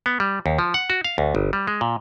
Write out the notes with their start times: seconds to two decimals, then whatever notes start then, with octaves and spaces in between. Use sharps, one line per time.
0.06 B3
0.20 G3
0.46 D#2
0.59 F3
0.74 F#5
0.90 F#4
1.04 F5
1.18 D2
1.35 G1
1.53 G3
1.67 G#3
1.81 A#2